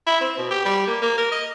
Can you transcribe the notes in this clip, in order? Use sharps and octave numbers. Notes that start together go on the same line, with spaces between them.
E4
C4
B2
G4
G3
A#3
A#3
A#4
D#5